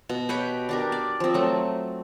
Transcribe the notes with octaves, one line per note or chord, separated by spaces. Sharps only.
B2
G4 B4 C#5 G5
D4 G4 A#4
D5
F3 C4
F#3 A3